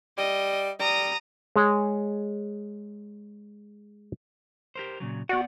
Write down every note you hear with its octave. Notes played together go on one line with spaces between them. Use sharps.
G3 D#5
G3 A#5 D#6
G#3 G#4 C#5
G4 A#4 C5
A#2 C#3 F#3
B3 F#4 D5 F#5